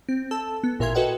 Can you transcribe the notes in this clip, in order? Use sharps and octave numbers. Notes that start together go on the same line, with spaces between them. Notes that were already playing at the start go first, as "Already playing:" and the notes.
C4
A4 A5 E6
B3
A1 A#2 A#4 E5 C6 G#6
F#4 A4 B4 D#5 F#5 G5